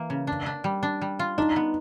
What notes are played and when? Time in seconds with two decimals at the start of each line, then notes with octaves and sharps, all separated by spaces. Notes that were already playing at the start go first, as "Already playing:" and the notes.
Already playing: E3 A#3
0.10 C#3
0.27 D4
0.46 D4
0.64 G3
0.83 D4
1.01 G3
1.19 F4
1.38 D4 D#4
1.56 B3